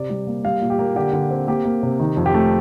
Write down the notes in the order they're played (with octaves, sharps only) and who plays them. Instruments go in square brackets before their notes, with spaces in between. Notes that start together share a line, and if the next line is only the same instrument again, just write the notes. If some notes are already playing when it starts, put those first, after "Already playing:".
Already playing: [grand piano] C3 D5
G3
A#3
G3 F5
A#2
G4
A#3
D3 G4
D3
C4
A#3 G4
A#3
C3
D#3
F2
G4
A3